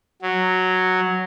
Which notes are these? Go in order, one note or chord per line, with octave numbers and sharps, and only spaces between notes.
F#3